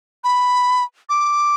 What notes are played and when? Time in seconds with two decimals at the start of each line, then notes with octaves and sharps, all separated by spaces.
0.24 B5
1.09 D6